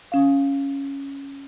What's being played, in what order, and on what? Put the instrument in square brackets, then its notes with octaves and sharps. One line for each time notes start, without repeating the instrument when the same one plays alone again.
[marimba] C#4 F5